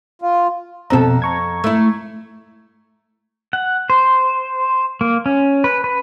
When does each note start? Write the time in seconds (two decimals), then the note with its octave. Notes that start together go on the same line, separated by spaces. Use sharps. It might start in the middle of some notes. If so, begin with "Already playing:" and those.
0.22 F4
0.90 F2 B2 C4 A4 A#5
1.22 A#5 C#6 G#6
1.64 A3 E4
3.53 F#5
3.90 C5
5.01 A#3
5.26 C#4
5.64 B4
5.84 B4